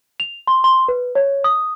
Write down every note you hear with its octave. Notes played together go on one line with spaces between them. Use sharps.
F7
C6
C6
B4
C#5
D#6